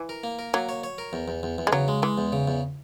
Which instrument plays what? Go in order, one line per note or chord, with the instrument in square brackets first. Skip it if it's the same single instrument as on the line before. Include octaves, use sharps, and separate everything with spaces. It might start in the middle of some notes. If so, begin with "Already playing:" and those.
Already playing: [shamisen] E3
[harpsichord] A#4
A#3
A#4
[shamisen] F#3 [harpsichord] A#3
[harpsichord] C#5
C#5
A#4
E2
E2
E2
E2
[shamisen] G#3
[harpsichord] C#3 [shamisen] F#3
[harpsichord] G#3
[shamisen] E3 [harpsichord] G#3
[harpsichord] E2
C#3
E2